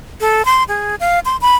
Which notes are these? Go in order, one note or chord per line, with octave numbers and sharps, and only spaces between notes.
A4
C6
G#4
F5
C6
B5